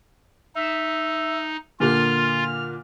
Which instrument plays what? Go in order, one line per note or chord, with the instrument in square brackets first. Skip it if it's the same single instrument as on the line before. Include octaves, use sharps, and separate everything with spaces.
[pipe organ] D#4 [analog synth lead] E5
[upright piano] A#2 D3 A#3 [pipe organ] F4 [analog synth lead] F6